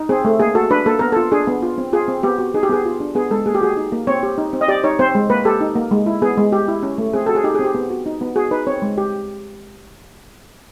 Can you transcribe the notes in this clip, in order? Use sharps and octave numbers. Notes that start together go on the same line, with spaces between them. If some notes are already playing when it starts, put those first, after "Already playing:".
Already playing: D#4
C4 G#4
A3
A#3 G#4
F#4 A4
D4 B4
A#3 A4
B3 A#4
A4
F4
D4 G#4
B3
F4
C4
F4 G#4
C4
B3 G4
F#4
D#4 G#4
G4
B3 G#4
F4
D4
B3 G#4
G#3 A4
A#3 G#4
G4
F#4 G#4
D#4
A#3
C4 C#5
G4
D#4
C4
D#5
G4 D5
D#4 C#5
C4 C5
G#3
A#3 B4
G4 A4
D#4
A#3
G#3
E4
B3 G#4
G#3
G4
E4
C#4
A3
C4 G#4
F#4 A4
G#4
D#4 G4
G#4
C4 G4
B3
F#4
D#4
B3
F#4 G#4
D#4 B4
C4 C#5
G#3
G4